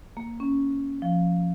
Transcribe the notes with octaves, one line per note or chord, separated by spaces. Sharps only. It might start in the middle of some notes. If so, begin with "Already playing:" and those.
A#3
C#4
F3